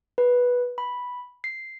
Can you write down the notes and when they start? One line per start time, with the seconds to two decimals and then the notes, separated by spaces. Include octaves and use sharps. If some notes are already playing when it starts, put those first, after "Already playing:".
0.18 B4
0.78 B5
1.44 C7